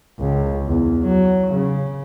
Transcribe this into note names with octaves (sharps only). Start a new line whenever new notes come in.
C#2
E2
F#3
C#3